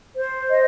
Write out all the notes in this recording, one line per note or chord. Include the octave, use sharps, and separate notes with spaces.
C5
D#5